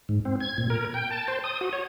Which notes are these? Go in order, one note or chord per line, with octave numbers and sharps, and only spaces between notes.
G#2
C4
G#6
A#2
A#4
G5
A5
C5
D#6
F#4
C#5